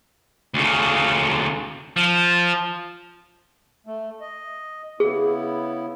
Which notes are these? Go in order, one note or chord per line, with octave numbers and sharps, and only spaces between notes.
D2 C#3
F3
A3
D#5
C#3 B3 E4 G#4